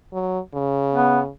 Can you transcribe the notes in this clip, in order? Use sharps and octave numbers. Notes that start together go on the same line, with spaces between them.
F#3
C#3
B3